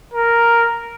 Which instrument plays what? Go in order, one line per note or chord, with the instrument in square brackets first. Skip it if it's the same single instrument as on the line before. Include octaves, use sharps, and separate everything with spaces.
[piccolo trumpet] A#4